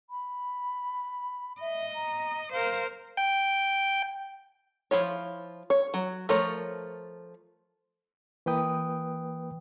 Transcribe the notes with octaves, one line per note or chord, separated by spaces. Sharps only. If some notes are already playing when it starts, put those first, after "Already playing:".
B5
D#5 E5
A#5
A#4 C5 F5
G5
F3 E4 F4 C#5
C#5
F#3
F3 A3 A#4 C#5
E3 A#3 B4 G5 D#6